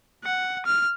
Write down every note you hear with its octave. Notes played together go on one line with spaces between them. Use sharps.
F#5
F6